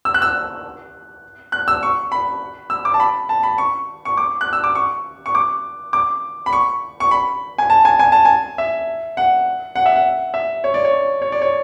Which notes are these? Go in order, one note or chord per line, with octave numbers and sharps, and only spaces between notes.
E6
F#6
E6
F#6
E6
C#6
B5
E6
D6
A5
B5
A5
B5
C#6
C#6
D6
F#6
E6
D6
C#6
C#6
D6
D6
B5
C#6
C#6
B5
G#5
A5
G#5
G#5
A5
G#5
E5
F#5
F#5
E5
F#5
E5
C#5
D5
C#5
C#5
D5
C#5